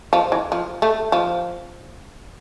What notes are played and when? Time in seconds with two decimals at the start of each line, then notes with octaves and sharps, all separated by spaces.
0.13 F3
0.32 E3
0.52 F3
0.82 A3
1.12 F3